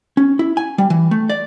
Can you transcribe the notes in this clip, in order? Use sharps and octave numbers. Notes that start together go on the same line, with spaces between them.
C#4
E4
G#5
G3
E3
A3
D5